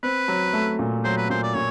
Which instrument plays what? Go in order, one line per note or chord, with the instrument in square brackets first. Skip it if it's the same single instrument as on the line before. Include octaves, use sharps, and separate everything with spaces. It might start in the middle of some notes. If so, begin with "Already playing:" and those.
[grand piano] C4 [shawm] B4
[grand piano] F#3
A3
A#2
[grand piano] F#3 [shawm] C5
[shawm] B4
[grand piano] A#2 [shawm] C5
[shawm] D5
[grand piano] A#2 [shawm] C#5